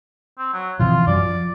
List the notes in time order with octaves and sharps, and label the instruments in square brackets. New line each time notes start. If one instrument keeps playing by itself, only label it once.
[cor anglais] C4
F#3
[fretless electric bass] C3 E3 F3 [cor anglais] F4
[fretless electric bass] F#2 F#3 [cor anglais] D5
[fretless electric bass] F3